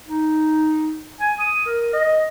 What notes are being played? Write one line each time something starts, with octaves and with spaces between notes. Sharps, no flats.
D#4
G#5
D#6
A#4
D#5